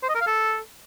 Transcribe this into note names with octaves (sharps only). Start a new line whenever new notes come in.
C5
D#5
A#4
F5
A4